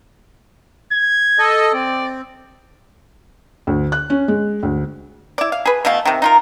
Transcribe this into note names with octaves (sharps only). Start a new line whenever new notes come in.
G#6
A4 D#5
C4 D5
D2
F#6
C#4
G#3
D2
E4 D5
F5
G#4 B4
B2 E3 A3 F5
C3 D#3
D#4 F4 A#4